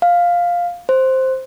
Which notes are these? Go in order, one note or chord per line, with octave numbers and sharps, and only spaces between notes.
F5
C5